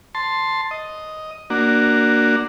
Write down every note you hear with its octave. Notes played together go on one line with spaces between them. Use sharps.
A5 C6
D#5
A#3 D4 F#4